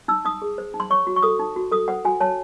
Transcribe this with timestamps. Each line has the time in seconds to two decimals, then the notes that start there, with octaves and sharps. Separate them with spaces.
0.08 D#4 E6
0.25 D#4 D#6
0.42 G#4
0.58 C5
0.74 D#4
0.80 C6
0.90 C#5 C#6
1.07 F#4
1.16 C#6
1.23 A4 D#6
1.39 D#4
1.56 F#4
1.72 A4 D#6
1.88 C5 F#5
2.05 F#4 G#5
2.20 C#5 A5